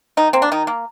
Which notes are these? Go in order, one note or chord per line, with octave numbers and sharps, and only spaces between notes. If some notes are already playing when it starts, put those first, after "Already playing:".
D#3 D#4
A#3 C4
D4
D#3 D#4
A#3